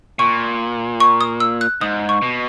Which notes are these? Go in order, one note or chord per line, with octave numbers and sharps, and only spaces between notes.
A#2 C#6
C#6
D#6
E6
F#6
G#2 D#6
C#6
B2